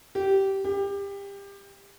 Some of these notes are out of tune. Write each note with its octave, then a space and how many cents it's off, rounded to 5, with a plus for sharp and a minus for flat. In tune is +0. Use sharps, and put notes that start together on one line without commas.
G4 -15
G4 +25